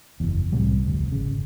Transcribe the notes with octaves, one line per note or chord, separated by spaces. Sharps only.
F#1 E2
C2 A2 C3 G3
F1 D2
G#1 C#3